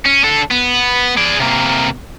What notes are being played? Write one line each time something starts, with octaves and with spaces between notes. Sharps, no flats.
C#4
D4 A4
B3
G#4 D5
C3 A#3